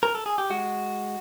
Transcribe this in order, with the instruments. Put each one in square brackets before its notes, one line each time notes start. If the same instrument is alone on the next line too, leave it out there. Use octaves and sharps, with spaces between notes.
[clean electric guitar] A#4
A4
G#4
G4
G#3 F#4